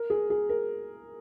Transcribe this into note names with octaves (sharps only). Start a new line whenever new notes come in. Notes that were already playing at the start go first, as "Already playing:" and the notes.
Already playing: A#4
G#4
G#4
A#4